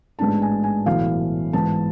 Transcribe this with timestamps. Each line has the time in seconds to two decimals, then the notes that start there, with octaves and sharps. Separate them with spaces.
0.19 A1 G#2 G#3 B3 D4 A5
0.42 G#5
0.63 G#5
0.86 B1 A2 E3 A3 F5
1.53 G#2 E3 B3 A5